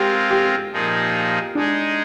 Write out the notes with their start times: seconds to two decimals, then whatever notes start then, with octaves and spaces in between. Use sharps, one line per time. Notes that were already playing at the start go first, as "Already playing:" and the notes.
Already playing: G#3 C4 F4 G4 A#4
0.30 G4
0.72 A#2 F3 A#3 D#4 G#4
1.55 G#3 D4 D#4 G#4